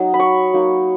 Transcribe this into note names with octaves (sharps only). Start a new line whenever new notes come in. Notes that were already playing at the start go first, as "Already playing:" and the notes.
Already playing: F#3 D#4
B5
C#6
F#3 A#3 D#4